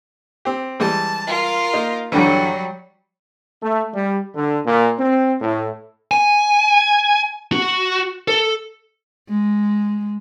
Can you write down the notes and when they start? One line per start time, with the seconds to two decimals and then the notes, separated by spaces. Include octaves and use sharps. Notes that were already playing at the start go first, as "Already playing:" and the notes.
0.45 C4 G4
0.80 E3 G3 G#3 A5
1.28 F4 A#4
1.73 A#3 D#4
2.12 G2 D3 E3 F#3 G3
3.61 A3
3.94 G3
4.35 D3
4.65 A#2
4.98 C4
5.40 A2
6.11 G#5
7.53 F#4
8.28 A4
9.29 G#3